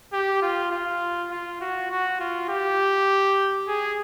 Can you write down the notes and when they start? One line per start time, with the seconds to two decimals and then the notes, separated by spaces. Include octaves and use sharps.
0.13 G4
0.42 F4
0.71 F4
1.31 F4
1.61 F#4
1.91 F#4
2.20 F4
2.49 G4
3.68 G#4